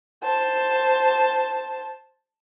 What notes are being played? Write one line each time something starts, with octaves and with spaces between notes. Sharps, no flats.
C5 A5